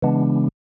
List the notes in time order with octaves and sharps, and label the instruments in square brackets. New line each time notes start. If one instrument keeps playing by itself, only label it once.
[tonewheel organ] C#3 E3 G#3 B3 D4